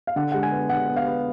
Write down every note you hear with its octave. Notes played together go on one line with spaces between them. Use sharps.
F5
D3 F#5
G#3 F#5
G#5
B3
D3 F#5
B3
F5
B3